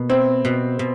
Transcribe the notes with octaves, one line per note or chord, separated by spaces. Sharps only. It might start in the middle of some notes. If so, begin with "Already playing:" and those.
Already playing: B2 A#3
C4 E4
B2
B2